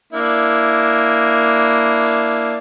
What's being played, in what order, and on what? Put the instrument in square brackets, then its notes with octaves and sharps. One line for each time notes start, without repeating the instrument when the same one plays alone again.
[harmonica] A#3 D4 E4